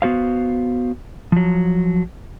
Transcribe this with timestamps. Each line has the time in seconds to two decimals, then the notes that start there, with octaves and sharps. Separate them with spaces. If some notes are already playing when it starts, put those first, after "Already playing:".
0.02 B3 F#4 C5 F5
1.32 F3 F#3